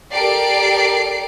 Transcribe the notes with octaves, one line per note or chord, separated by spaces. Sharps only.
G4 A4 A#4 D5 C7 D7